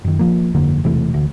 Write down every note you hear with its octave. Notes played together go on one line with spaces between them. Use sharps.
F#2 D#3
F3 A#3
G1 F2 D3 A#3
E1 C3 E3 A3
D2